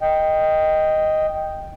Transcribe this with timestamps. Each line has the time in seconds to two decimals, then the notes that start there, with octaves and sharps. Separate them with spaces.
0.02 D#5 G5